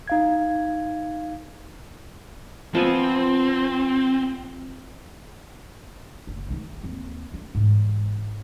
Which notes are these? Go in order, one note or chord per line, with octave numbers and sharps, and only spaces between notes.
D#4 F5 G#6
F3 B3 C4 G#5
F#1
D#3 D#4
D#2 C4
D4
G#2 E3